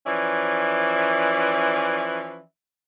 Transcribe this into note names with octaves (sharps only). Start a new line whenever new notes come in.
E3 F3 C#4 D5 E5